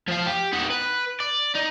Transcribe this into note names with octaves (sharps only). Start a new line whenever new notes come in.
F3 F5
G4
D#4 F#4
B4
D5
D#4